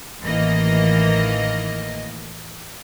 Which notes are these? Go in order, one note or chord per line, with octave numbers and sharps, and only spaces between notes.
A1 D#3 E3 A#3 D#5